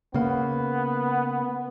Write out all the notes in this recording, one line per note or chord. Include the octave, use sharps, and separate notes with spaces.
C#3 A#3 B3